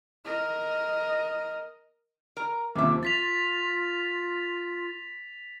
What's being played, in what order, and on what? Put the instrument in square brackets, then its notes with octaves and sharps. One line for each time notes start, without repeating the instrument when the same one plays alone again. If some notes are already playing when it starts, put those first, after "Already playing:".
[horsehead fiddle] A#4 D#5
[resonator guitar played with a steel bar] A#4 A#5
[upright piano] D#2 C3 F3 [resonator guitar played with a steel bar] C#4 E5 [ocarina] D6
[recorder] F4 [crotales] A6 B6 F7